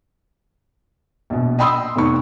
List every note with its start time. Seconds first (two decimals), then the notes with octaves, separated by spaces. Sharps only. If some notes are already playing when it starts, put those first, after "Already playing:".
1.30 A#1 B2
1.59 D#5 G5 B5 C6 D#6 E6
1.96 F1 B3 D#4 C#6